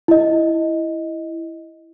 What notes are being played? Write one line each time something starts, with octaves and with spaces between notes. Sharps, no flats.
E4 D#5